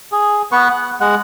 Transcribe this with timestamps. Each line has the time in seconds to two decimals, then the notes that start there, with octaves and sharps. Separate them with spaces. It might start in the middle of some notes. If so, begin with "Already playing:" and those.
0.12 G#4
0.52 B3 B4 C#6
0.70 F#5
1.01 G#3 F#5